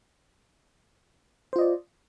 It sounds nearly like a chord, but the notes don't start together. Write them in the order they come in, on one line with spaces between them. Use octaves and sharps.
C5 F4 D#5 D5